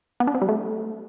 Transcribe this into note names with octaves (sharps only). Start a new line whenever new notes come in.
B3
D4
C4
G3
A3